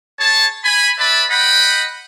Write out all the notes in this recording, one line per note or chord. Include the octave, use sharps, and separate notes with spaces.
G#4 C#5 A5
G#5 B5
B4 D5 E5 A5 B5
D#5 F#5 G5 B5